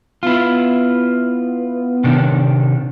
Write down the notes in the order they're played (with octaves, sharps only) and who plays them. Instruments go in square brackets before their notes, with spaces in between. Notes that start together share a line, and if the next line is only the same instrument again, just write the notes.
[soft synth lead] B3 [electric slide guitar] E4 F4
[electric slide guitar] C3 D#3 D4